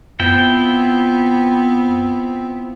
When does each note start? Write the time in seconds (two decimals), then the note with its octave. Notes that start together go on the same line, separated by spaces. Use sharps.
0.20 F#2 B3 C4 E4 F4 G5